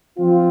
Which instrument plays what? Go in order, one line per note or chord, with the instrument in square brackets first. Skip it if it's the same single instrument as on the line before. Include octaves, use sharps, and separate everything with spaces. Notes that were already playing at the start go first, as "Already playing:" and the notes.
[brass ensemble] F3 C4 F4